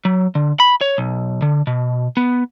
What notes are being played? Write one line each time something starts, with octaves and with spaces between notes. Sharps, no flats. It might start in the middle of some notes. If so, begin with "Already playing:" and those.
F#3
D3
B5
C#5
B1
D3
B2
B3